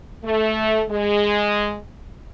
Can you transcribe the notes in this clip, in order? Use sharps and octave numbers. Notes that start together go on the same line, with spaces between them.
A3
G#3